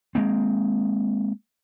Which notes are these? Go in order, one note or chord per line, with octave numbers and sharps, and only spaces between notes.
G#3 A#3 C4